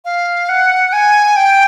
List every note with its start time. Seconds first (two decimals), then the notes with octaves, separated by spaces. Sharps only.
0.05 F5
0.49 F#5
0.93 G#5
1.36 G5